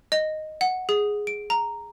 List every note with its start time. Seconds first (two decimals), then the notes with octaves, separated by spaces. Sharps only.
0.12 D#5
0.61 F#5
0.89 G#4
1.27 D7
1.50 A#5